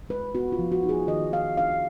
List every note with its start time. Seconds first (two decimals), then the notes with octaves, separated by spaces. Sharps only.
0.09 G#3 B4
0.35 B3 F#4
0.52 F4
0.59 F3
0.72 F#4
0.83 D#4
0.89 G#4
1.07 D#3 D#5
1.33 D#3 F5
1.57 D4 F5